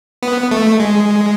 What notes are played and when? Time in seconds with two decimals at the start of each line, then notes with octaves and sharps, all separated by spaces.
0.23 B3
0.51 A3
0.80 G#3